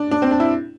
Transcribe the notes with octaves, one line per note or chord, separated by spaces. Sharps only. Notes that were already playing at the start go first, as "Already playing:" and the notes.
Already playing: D4
D4
C4
D4
E4